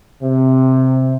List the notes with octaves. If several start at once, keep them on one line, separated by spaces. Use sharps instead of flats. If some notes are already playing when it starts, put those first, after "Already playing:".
C3